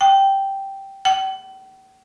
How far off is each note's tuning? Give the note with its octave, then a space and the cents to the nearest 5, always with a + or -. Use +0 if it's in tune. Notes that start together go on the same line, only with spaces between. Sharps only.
G5 -5
G5 -45